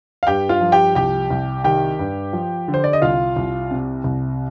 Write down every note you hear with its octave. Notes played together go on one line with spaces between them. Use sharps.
F5
G2 G4 G5
F4 F5
F3
G4 G5
C2 G4 G5
C2
D#3 G4 G5
G2
F3
D3
C5
D5
D#5
C2 F4 F5
C2
C3
C2